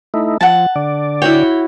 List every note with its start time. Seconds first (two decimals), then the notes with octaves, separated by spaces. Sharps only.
0.14 A3 D#4 E4
0.41 F3 F#5 A5
0.76 D3 D5
1.22 E4 F#4 C#5 G5